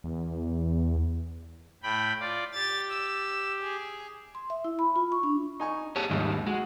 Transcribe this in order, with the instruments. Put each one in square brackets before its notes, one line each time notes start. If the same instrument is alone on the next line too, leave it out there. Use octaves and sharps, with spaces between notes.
[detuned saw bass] E2
[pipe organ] A2 G5 B5
F4 D5
[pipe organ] G4 [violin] A6
[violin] E6
G#4
[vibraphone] C6
E5
E4
B5
F4
C#6
D4
[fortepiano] D#4 G#5 C#6
[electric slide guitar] G4 G#4 C#5 [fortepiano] A5
[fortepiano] A#1 D#2 [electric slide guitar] G#2 D#3 G3
[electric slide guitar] G#3 [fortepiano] F#4 F#5